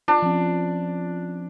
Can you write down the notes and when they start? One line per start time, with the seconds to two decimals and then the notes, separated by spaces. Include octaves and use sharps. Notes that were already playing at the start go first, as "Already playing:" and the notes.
0.08 D4 F4
0.22 F3 C4 C#4